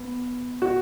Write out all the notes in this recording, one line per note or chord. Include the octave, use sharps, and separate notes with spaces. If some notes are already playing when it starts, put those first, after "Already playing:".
Already playing: B3
F#4